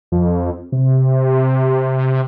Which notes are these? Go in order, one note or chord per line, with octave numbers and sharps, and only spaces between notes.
F2
C3